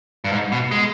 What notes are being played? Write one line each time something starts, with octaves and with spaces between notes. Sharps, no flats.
G2
G#2
B2
G#3